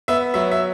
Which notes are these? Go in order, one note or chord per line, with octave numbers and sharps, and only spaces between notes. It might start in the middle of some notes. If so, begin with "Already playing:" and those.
B3 E5
F#3 E5
E5